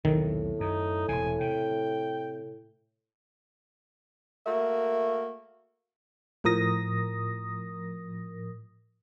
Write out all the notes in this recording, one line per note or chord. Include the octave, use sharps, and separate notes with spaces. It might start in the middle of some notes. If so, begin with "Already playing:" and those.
B1 E2 A2 C3 D#3
F#2 D#4
E1 E2 C3 G#5
C3 G5
A3 A#3 F#4 A#4 E5
A2 F3 A#4 D#6 A#6